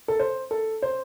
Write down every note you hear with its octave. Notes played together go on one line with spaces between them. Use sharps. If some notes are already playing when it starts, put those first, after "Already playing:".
A4
C5
A4
C5